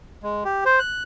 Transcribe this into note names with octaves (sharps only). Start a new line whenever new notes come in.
G#3
G4
C5
F#6